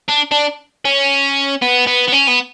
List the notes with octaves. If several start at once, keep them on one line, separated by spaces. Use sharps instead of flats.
D4
D4
C#4
B3
B3
B3
C#4
B3